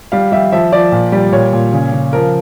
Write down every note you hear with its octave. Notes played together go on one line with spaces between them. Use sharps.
G3 F5
G3 E5
F3 E5
F3 D5
A#2
G3
A#2 C#5
A#2
C#3
C#3
F3 A#4